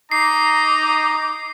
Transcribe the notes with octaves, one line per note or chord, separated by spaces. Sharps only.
D#4 A#5 D6 C7